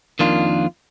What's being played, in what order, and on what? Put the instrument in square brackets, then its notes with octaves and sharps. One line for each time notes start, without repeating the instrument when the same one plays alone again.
[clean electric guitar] F2 D#3 A#3 D4 F4